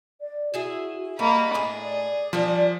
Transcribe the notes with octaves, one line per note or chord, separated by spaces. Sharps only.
D5
E4 F#4 G#4 E5
G3 A#3 F#4 D#5 B5
A2 D4 G#4
D5
F3 G3 D4 A#4